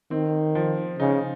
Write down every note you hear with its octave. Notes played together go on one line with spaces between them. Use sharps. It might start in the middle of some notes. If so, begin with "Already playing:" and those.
D#3 C4
F3
C#3 D#4